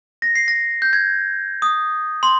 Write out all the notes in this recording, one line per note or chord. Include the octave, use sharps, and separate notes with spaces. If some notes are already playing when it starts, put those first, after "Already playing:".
A#6
C7
A#6
G6
G#6
D#6
C6